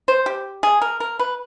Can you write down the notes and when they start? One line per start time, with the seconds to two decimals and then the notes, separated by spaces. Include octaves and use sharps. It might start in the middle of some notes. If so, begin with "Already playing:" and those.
0.08 C5
0.26 G4
0.63 G#4
0.82 A#4
1.00 A#4
1.19 B4